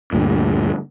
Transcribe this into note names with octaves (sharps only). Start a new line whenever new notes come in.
D2 G2 A#2